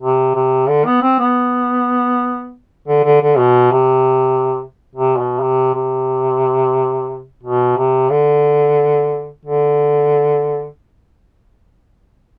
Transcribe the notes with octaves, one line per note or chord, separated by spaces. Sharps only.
C3
C3
D3
B3
C4
B3
D3
D3
D3
B2
C3
C3
B2
C3
C3
B2
C3
D3
D3